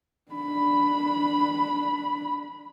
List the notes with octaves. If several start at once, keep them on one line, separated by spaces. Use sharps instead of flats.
D4 B5